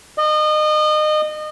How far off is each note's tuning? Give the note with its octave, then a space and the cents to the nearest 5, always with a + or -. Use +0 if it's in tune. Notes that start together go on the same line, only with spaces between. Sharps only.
D#5 -30